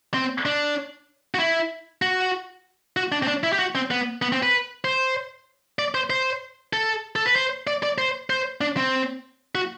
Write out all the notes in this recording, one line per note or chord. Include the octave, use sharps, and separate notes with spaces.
C4
D4
F#4
E4
F#4
F#4
D4
C4
D4
E4
G4
F#4
C4
B3
B3
C4
B4
C5
D5
C5
C5
A4
A4
B4
C5
D5
D5
C5
C5
D4
C4
F#4